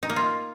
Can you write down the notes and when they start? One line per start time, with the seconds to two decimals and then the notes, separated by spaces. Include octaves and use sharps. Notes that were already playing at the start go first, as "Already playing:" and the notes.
0.03 D#4
0.09 A#3
0.16 F4